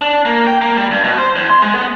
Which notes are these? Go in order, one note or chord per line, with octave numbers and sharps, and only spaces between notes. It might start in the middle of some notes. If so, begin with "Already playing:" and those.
D4
A#3
G5
A#3
G3
G2
B2
C5
E2
C6
G#3
B3